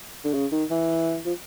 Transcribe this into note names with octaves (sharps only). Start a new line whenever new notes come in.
D3
C#3
D#3
E3
F3